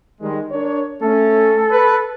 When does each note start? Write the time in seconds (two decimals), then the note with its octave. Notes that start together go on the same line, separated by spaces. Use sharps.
0.21 D#3 G3 G#3
0.51 D4 A#4 C#5
1.02 A3 C#4 A4
1.71 B4